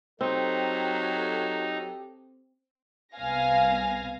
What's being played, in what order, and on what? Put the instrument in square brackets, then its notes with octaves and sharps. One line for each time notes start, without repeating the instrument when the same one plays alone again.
[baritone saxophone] F#3 [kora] C4 [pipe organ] D#4 [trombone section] G4 A4
[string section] C2 B3 F5 G#5 A#6